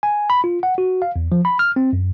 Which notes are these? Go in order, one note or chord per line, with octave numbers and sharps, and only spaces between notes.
G#5
B5
F4
F#5
F#4
F5
E2
F3
B5
F6
C4
F#2